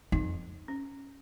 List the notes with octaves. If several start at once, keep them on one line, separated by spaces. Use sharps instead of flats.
F2 D#4
C#4